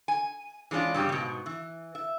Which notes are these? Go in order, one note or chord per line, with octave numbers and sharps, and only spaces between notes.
G#5
E3 G#3 C#4 D4 F4
G2 C#3 G3 G4
G#2 B2
E3
E5